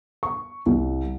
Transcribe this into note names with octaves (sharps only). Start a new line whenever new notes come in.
C#6
C2